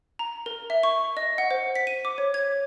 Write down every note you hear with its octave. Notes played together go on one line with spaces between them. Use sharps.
A#5
A#4
E5
C#6
D#5
F#5
C5
B6
D#7
D6
C#5
G#6